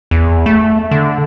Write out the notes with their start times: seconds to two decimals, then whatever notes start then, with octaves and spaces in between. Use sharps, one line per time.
0.11 E2
0.46 A3
0.91 D3